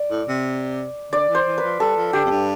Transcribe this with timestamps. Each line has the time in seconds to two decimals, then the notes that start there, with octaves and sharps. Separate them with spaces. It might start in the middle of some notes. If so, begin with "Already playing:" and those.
Already playing: D5
0.11 A2
0.28 C3
1.12 D3 D5
1.29 E3
1.35 C5
1.46 E3
1.58 B4
1.63 F3
1.80 G3 A4
1.96 F3
2.13 D3 G4
2.26 F2
2.30 G2